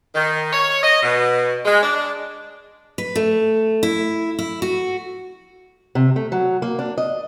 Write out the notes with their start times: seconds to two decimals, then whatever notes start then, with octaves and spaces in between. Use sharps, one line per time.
0.15 D#3
0.52 C#5
0.82 D#5
1.03 B2
1.65 G#3
1.83 D4
2.98 B4
3.16 A3
3.83 E4
4.39 E4
4.62 F#4
5.95 C3
6.16 A3
6.32 F#3
6.62 A#3
6.79 D4
6.98 D#5